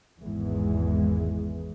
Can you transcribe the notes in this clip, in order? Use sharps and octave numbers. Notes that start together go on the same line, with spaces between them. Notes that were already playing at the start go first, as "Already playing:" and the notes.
G#1 E2 E3 G#3